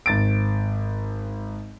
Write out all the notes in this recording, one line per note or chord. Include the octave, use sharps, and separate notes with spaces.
G#1 A6 D7